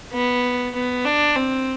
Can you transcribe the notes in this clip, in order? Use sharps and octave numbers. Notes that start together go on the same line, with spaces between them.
B3
B3
D4
C4